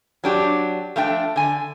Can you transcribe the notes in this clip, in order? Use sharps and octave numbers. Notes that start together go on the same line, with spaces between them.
F#3 D4 G4
F3 A3 D4 G5
D3 G#5